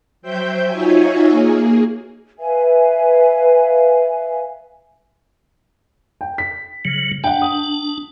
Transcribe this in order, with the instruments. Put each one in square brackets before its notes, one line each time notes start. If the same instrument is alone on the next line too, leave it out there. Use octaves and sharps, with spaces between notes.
[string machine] F#3 C5 E5 G5 G6
D#4 F4 F#4 C#5 E5 G#5
A#3 G#4
[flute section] B4 E5 F5 G#5
[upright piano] G5
B6
[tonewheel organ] C#3 F#3
[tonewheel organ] D4 [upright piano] F#5 G5
[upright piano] D#6